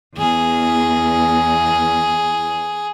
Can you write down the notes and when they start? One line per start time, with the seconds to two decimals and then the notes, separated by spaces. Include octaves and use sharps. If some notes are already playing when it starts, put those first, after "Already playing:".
0.18 E2 G#4